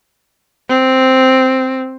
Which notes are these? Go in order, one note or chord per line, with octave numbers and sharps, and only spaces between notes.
C4